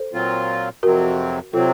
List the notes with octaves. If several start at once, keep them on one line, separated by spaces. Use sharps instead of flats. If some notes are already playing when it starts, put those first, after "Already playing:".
Already playing: A4 C5
A#2 F#3 C4 F4
F2 C3 F#3 C4 F#4 A#4
C3 F#3 C4 F4 A4